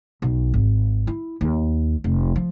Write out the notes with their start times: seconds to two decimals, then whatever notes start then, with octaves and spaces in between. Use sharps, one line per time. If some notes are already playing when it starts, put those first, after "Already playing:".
0.22 B1
0.54 G#1
1.07 E4
1.41 D#2
2.04 F1
2.36 F3